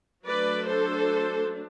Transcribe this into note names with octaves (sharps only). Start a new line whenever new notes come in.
F#3 A3 D4 B4 D5
A4 C5